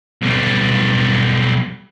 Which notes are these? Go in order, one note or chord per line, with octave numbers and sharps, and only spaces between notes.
B1 G3